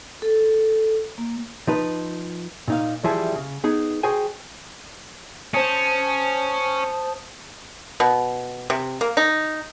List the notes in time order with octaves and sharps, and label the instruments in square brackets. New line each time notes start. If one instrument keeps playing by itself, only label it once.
[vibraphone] A4
A#3
[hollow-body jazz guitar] F3 D#4 B4
A#2 D#4 F5
E3 F3 G3 E4 G#4 E5
C#3
B3 D#4 G#4
F#4 G#4 C5 G5 G#5
[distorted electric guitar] C#4 [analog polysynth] C5 A5 D#6
[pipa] B2
C3
A#3
D#4